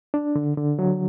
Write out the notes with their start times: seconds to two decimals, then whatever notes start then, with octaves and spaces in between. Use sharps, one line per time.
0.14 D4
0.35 D3
0.57 D3
0.79 F#3